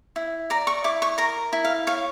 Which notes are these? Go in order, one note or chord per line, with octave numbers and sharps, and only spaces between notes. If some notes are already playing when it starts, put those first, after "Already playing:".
E4
D5 A#5
C#6
E4 D6
C#6
A#4 A#5
E4
F5
C#5 F5